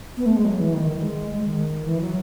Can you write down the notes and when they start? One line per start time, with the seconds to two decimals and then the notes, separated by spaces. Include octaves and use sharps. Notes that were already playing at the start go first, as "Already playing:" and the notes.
0.17 B3
0.26 A3
0.36 G#3
0.45 F#3
0.60 E3
0.74 D#3
0.87 D#3
1.02 G#3
1.30 G#3
1.44 D#3
1.85 E3
2.01 F#3